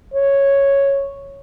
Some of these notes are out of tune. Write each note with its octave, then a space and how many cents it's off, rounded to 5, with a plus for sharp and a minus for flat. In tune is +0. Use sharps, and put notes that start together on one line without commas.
C#5 -5